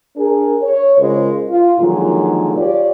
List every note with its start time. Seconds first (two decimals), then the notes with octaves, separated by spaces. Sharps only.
0.17 D4 G#4 A#4
0.63 C#5
0.98 C#3 G#3 F4 A#4 C5
1.49 F4
1.78 A#2 D3 D#3 F3 F#3 G#3
2.56 F4 G4 C#5 D5